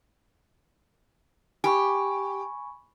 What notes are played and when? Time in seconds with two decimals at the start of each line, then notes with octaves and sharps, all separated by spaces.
1.64 G4 G#5 B5 C#6